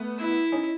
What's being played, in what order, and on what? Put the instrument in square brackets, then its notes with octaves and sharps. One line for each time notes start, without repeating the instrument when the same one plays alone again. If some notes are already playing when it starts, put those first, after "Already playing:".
Already playing: [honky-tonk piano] A3 B3
[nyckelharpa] E4
[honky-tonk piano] C#4 D#4